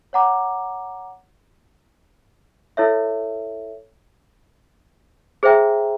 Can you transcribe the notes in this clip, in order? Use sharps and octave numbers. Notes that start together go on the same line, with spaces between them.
C#5 F#5 A#5 D6
E4 A4 C#5 E5
G#4 C5 E5 G5 A#5